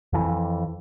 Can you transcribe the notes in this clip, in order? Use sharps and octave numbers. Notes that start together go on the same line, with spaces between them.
F2 E3